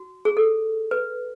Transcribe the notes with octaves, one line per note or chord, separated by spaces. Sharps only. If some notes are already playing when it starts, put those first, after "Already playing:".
Already playing: F#4
G#4
A4
B4